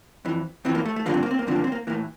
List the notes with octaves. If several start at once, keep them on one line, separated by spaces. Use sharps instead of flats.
F2 E3
F2 E3 C4
A#3
A3
A3
G2 D3 F3 A#3
C4
A#3
C4
A#3
G2 D3 F3 C4
A#3
C4
A#3
A2 E3 A#3